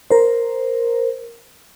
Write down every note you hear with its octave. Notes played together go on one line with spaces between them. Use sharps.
A#4 C5